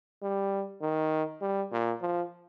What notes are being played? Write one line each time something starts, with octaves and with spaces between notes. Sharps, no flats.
G3
D#3
G3
A#2
F3